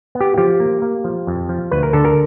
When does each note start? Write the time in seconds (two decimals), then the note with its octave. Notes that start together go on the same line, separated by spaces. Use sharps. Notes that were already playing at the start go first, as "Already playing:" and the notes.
0.15 B3
0.20 G4
0.38 F3 G4
0.60 A#3
0.82 A#3
1.04 F3
1.27 F2
1.49 F3
1.72 D2 B4
1.83 A#4
1.93 D3 A4
2.05 A#4